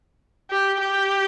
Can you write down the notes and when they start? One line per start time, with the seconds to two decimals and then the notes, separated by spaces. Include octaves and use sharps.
0.51 G4
0.80 G4